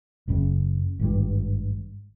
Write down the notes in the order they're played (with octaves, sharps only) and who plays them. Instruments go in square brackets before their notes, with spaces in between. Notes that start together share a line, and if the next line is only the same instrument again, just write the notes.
[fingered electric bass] F#1 C#3
G#1 G2 G3